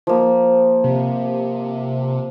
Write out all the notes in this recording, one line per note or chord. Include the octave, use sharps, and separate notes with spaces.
F3 A#3
C3